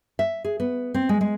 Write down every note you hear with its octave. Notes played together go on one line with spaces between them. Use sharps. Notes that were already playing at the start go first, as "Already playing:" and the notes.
E5
G#4
B3
C4
G#3
G#3